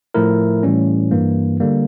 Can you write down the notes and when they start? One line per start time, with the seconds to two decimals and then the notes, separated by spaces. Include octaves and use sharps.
0.14 A2 F3 A3 E4 A#4
0.63 A2 E3 G3 C#4
1.11 G2 E3 A#3
1.60 D3 G3 A#3